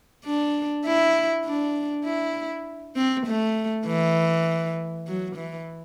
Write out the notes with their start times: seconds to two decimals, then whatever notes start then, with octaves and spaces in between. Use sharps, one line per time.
0.25 D4
0.85 E4
1.45 D4
2.04 E4
2.96 C4
3.26 A3
3.86 E3
5.07 F#3
5.36 E3